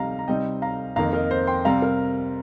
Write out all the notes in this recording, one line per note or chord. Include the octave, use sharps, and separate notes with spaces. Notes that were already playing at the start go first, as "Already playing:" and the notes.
Already playing: C3 G3 D#4 F5 A#5
A#5
C3 G3 C4 D#4 D#5 G5
F5 A#5
F2 D#3 A#3 F5 A#5
A#4 D#5
C5
G5 C6
C3 G3 C4 F5 A#5
A#4